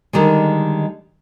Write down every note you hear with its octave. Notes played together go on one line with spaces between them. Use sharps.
D3 D#3 G3 G#3